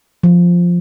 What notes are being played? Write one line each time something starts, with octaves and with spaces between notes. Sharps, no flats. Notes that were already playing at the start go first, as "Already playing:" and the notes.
F3